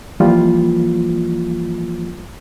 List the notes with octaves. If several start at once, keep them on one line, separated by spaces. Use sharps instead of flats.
E3 F3 G3 A#3 F4